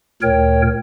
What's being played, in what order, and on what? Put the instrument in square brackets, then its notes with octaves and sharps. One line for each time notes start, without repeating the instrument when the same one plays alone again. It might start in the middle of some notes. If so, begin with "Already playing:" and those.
[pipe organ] D2 A#2 A#4 C#5 G5